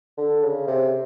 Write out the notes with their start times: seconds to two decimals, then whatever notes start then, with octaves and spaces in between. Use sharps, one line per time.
0.18 D3
0.43 C#3
0.67 C3